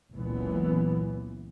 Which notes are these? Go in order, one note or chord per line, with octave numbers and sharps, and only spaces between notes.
F#1 C#2 A#2 E3 B3